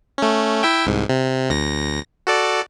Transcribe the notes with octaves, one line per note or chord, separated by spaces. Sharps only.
A3 C#4
E4 E5 G5
C2 G#2
C3
D2 A#6
F#4 A4 D5